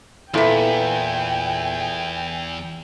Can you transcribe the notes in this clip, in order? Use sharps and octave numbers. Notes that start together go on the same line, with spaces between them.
E2 A#2 E4 A4 B4 G5 G#5